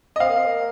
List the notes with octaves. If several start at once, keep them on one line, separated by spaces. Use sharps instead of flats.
D#5
C4 F5
A#3
C4
A#3